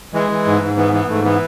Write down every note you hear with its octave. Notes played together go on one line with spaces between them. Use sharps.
E3 G#3
E3
G#2
G#2
E3 B3
E3 B3
G#2 A3
E3 B3